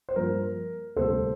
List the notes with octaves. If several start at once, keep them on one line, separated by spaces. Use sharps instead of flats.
C5
G2 F3 A#3 A#4
D2 C3 G3 A#3 A4 C5